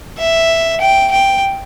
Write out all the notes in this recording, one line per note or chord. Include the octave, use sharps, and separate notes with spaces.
E5
G5
G5